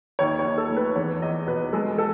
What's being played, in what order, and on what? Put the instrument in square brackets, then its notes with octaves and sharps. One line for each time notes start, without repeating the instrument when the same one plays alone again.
[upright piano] D#2 C#5
C#5
D#2
A4
A3
B4
E2 C#5
E2 D#5
B2 B4
G#3 A4
A4